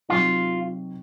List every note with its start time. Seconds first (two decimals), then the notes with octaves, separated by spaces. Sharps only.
0.09 C3 F#3 C4 D#4 F4